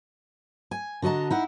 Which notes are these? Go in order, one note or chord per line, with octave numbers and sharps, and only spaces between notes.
G#5
D3 F#4 D#5 A5 A#5
D#4 E4 F#5